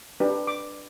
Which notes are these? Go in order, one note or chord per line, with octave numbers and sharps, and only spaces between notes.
D4 G4 B4
D6